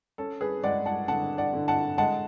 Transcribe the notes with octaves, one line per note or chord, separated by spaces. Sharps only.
C#4 A4
G#4 B4
G#3 D5 F#5
F#5 A5
D3 F#5 A5
D5 F#5
D3
F#5 A5
G#3 F#5 A5